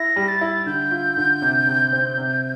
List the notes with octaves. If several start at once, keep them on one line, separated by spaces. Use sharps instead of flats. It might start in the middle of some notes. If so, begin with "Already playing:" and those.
Already playing: E4 A#6
G3
A6
E4
D3 G6
F4
D3
C3
C3
C4
C3